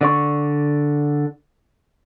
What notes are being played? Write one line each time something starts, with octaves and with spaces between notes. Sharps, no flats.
D3 D5 C#6